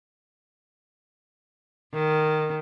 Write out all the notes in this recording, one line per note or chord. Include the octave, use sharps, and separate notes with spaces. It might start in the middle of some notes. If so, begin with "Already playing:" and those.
D#3